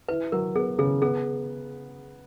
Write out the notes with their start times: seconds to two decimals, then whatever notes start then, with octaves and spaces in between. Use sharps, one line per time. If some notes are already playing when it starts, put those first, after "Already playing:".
0.09 E4 B4
0.32 F#3 A#4
0.55 B3 G#4
0.78 C#3 G#4
1.02 B3 G#4